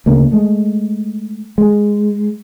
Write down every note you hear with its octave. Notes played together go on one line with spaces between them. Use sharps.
D2 C#3 A#3
G#3 A3
G#3